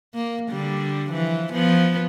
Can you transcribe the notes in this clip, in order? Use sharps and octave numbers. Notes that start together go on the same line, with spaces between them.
A#3
D3 G3
E3 F3
F3 B3